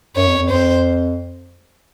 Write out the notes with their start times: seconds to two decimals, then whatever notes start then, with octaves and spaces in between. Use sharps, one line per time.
0.16 F#2 C#5
0.27 F2
0.39 F2
0.50 F2 C5